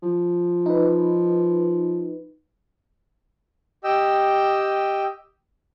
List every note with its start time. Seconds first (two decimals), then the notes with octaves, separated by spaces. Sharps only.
0.03 F3
0.66 D#4 B4
3.84 G4 D#5 G5 E6